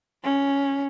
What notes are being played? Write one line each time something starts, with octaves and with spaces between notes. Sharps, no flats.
C#4